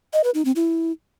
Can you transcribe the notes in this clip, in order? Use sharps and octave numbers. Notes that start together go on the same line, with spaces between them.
D#5
B4
D#4
C4
E4